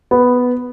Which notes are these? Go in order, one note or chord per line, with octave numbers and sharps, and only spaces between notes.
B3